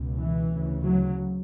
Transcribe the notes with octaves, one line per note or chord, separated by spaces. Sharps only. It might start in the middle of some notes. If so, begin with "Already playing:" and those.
Already playing: C#2 B2
E3
D2 C#3
F#3